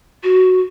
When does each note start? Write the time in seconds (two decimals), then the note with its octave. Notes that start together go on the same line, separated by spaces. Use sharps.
0.24 F#4